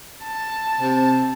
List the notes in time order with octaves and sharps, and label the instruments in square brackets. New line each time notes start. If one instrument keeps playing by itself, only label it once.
[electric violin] A5
[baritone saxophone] C3